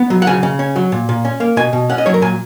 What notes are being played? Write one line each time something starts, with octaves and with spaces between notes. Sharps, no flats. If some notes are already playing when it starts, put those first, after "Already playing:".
Already playing: B3
F#3
F#5
C#3 G#5
C#3
C#4
F#3
A#2
A#2
C#4
A#3
B2 G#5
B2
C#4 F#5
D#5
F#3 C#5
A#4
A#2 G#5